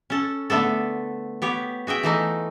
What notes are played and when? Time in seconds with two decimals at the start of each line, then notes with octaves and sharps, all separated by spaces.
0.10 C#4 A4
0.50 D3 A3 B3 A4
1.42 B3 G4 C#5
1.87 F#4 G#4 E5 G5
2.03 E3 A3 D#4